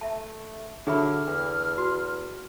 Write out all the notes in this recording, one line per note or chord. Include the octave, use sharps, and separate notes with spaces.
A3 E5 A5
D3 F#3 G#4 E5 B5 F6
E2 D4
F#4